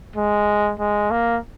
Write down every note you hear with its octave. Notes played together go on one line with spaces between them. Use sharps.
G#3
G#3
A#3